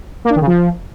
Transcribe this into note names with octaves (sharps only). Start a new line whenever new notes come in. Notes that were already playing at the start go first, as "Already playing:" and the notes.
A#3
D4
D#3
C#3
F3